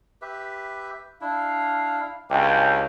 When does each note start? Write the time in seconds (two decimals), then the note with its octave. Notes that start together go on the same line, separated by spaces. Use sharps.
0.22 G4 B4 E5
1.21 D4 E4 F5
2.30 C#2 C#4 D4 G4 G5